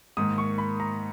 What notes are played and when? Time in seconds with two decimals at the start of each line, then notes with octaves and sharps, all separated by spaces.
0.17 G#2 D#3 A#3 D#6
0.38 C#6
0.58 B5
0.80 A#5